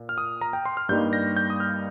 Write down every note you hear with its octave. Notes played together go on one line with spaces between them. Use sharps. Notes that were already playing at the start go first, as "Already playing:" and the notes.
Already playing: A#2
F6
D#6
A#5
G5
C6
F6
G2 G3 A#3 D#4 G6
A#6
G6
D#6
F6